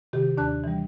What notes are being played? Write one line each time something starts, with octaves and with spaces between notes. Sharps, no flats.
C3 D#3 F#4 G4
D#2 D4 D5 A5 F#6
E3 G3